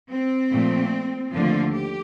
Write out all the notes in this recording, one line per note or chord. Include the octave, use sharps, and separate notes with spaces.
C4
A#2 F3 A3
D#2 D3 F3 A3 F4
G4